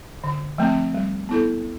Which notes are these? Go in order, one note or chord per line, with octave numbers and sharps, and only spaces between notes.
D3
F3 A3 C4
G3
B3 E4 A4